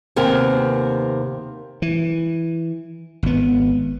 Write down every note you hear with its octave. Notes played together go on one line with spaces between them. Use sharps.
D#2 C3 B3 A#4 G#5
E3
G#1 B3